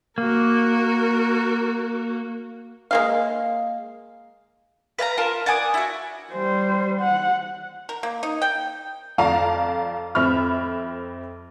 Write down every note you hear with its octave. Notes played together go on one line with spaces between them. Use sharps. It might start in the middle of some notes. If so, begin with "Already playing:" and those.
A#3 F#4 A#4
G#3 A#3 F5
B4 F5 A5 A#5
F4 A#4 A5
D5 F#5 G#5 D#6
E4 F#4
G3 C5
F#5
A#4
A#3
D#4
G5
F2 D5 F5 A5 A#5
F2 C4 E5 B5 F6